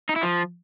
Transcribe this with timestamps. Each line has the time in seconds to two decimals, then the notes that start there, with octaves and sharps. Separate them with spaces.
0.09 D#4
0.16 E4
0.23 F3